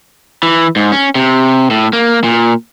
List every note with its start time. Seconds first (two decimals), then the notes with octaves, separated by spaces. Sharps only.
0.43 E3
0.76 G#2
0.92 C#4
1.15 C3
1.71 A2
1.93 A#3
2.24 A#2